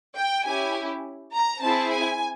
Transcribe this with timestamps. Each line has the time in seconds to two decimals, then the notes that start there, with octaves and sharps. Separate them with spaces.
0.18 G5
0.46 C#4 E4 G4 G#5
1.34 A#5
1.62 C4 E4 G#4 A5
1.91 G#5